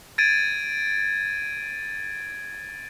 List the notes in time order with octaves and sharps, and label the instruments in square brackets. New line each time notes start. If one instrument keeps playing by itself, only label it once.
[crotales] G#6 A6 D7 D#7